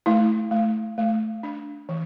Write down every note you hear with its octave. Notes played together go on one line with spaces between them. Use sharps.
A3 E4
A3
A3
D4
E3